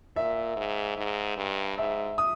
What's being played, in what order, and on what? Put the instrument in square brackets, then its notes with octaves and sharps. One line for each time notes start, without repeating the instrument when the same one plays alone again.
[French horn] A#2 [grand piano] E5
[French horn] G#2
G#2
G2
[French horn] G#2 [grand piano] E5
[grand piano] D#6